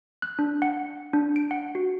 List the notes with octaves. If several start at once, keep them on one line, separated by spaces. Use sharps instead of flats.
F#6
D4
F#5
D4
D7
F#5
F#4